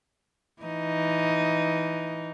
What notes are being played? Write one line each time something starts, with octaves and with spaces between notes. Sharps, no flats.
E3 D#4